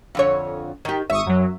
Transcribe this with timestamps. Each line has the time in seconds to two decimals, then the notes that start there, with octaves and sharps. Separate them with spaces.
0.15 F2 D3 C#5
0.85 D#3 G4
1.10 G#1 E5 C#6 D#6
1.26 F#2 F#3